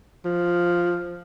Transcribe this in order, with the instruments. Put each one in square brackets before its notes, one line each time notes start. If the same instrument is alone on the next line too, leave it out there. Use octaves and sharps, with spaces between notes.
[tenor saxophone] F3